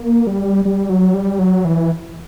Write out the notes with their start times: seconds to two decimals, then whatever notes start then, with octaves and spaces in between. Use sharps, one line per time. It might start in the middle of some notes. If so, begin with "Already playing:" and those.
Already playing: A#3
0.27 G3
0.65 G3
0.90 F#3
1.14 G3
1.39 F#3
1.65 E3